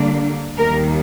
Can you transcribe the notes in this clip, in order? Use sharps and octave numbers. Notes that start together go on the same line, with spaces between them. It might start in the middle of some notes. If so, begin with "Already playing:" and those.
Already playing: D3 G3 A#3 D4
D#2 D#3 G3 A#3 A#4